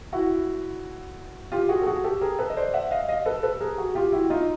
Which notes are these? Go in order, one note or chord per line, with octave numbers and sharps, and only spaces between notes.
E4 F#4
F4 G4
F#4 G#4
A4
F#4 G#4
G4 A4
G#4 A#4
A4 B4
D#5
C5 D5
E5 F#5
D#5 F5
D#5 F5
A4 B4
A4 B4
G#4 A#4
F#4 G#4
F4 G4
E4 F#4
D#4 F4